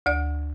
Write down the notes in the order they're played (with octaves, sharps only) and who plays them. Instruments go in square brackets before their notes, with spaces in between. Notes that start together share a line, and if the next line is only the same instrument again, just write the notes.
[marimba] D2 D5